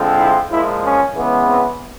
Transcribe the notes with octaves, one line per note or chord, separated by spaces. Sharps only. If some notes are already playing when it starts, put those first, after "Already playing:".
Already playing: D3 F3 G#3 C4
E4
A#2 F3 G#3 E4
C#4
C#3 E3 G#3 B3
C4